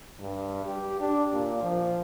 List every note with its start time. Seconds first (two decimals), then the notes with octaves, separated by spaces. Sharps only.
0.20 G2
0.65 G4
1.00 D4
1.33 A#2
1.62 F3